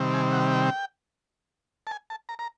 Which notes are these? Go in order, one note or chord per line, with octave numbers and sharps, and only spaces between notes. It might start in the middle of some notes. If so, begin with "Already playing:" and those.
Already playing: C3 D#3 G3 C4
G#5
F#5
G5
A5
G#5
A5
A#5
A#5